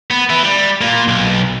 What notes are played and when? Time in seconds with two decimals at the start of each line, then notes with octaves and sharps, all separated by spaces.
0.11 B3
0.30 E4 B4
0.43 G3
0.81 A#3 F4
1.08 B1